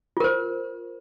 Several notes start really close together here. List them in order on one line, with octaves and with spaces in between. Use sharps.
F4 A#4 C5